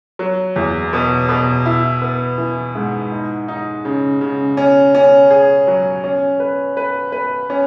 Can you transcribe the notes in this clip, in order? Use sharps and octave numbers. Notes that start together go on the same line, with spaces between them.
F#3
E2
B2
B2
E4
B3
E3
G#2
D#4
D#4
C#3
C#3
C#4
C#4
G#4
F#3
C#4
B4
B4
B4
C#4